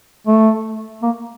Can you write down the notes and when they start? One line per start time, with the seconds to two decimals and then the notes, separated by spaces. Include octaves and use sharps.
0.27 A3
1.02 A#3